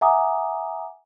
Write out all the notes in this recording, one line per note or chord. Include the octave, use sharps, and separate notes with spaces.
E5 F#5 G#5 A#5 D6 D#6